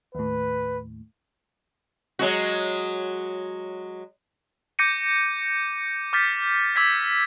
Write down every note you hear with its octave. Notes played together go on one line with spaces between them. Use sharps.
D#2 A2 B4
F#3 G#3 F#4
D6 G6 A#6 C#7 D#7
D6 F6 G6 A6 B6
D6 E6 G#6 A6 B6